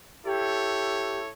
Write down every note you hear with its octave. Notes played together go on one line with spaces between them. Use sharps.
E4 G4 A4 C#5